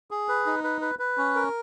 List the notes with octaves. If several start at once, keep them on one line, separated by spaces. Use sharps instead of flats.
G#4
B4
D#4
B4
B4
B4
C#4
A#4